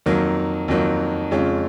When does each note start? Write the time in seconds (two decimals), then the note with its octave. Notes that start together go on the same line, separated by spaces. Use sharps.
0.06 F2 D#3 F#3 A#3
0.68 F2 D#3 F#3 A#3
1.31 F2 C#3 G#3 C#4 F4